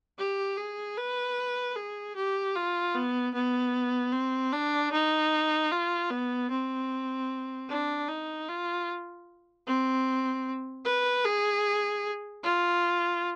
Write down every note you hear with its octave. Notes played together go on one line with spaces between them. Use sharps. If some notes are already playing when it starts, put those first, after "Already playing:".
G4
G#4
B4
G#4
G4
F4
B3
B3
C4
D4
D#4
F4
B3
C4
D4
D#4
F4
C4
B4
G#4
F4